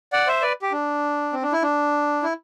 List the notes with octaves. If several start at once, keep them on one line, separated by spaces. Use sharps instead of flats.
D5 F#5
C5 E5
B4 D5
G4
D4
C4
D4
E4
D4
E4